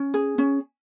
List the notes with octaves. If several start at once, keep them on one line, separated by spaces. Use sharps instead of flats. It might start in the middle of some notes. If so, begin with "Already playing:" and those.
Already playing: C#4
G#4
C#4